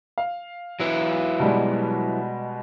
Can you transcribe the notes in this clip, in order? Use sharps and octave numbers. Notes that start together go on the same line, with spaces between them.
F5
F#3 E4 B4
B2 G3 G#3